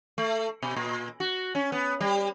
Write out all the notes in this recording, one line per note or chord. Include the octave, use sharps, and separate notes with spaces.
A3
B2
A#2
F#4
C#4
B3
G3